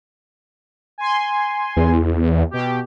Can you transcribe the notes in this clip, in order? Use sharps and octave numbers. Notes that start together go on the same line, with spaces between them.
G#5 C6
E2
B2 G4